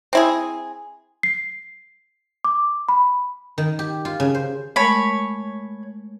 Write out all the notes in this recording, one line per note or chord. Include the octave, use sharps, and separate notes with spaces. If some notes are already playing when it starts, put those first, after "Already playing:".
C4 E4 G#4
C7
D6
B5
D#3
G4
F4
C#3
C5
G#3 A3 A#4 C#5 B5